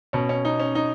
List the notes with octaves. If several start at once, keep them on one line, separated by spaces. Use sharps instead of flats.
B2 C#4
C#4
D#4
C#4
D#4